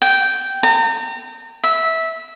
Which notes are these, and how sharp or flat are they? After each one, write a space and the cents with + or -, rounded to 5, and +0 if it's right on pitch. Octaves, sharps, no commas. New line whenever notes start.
G5 -10
A#5 -40
E5 -15